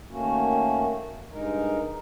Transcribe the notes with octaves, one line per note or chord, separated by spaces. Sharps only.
D#3 A3 A#3 C#4 F#4
G2 G#3 D#4 A#4